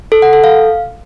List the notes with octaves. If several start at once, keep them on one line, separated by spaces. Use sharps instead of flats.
A4
F#5
A4
F5